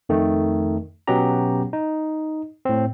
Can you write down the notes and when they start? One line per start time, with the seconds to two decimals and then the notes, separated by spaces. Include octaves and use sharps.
0.09 F2 D#3 A3
1.07 B2 F#3 B3 C#4 G4 A#5
1.73 D#4
2.65 A2 C4